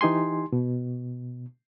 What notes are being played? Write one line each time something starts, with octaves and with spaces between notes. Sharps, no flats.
E3 D#4 G4 G#5 C6
B2